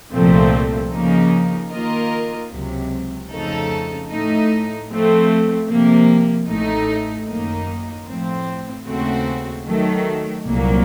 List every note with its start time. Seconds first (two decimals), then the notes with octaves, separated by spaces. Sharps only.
0.13 C2 A#2 F3 A3 C4
0.92 C#3 F3 A#3 D#4
1.71 D#3 A#3 F4 A#4 D#5
2.51 C#2 C3 F#3
3.30 F2 C#3 A3 D#4 A4
4.09 A2 A3 D#4
4.89 F3 A3 C4
5.68 C3 F3 A#3
6.47 A1 A2 A3 D#4
7.27 F#2 D#3 A#3 D#4
8.06 A2 F3 C4
8.86 D#2 C#3 A3 C4 F#4
9.65 D#3 F#3 A3
10.45 C2 A#2 F#3 A#3